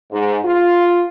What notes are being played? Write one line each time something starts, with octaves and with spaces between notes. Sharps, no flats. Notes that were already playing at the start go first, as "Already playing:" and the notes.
G#2
F4